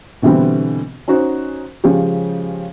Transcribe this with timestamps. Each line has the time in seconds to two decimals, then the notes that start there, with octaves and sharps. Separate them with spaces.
0.22 B2 D3 E3 G3 C4
1.08 C#4 D#4 F#4 C5
1.84 C#3 F3 G#3 C#4 G4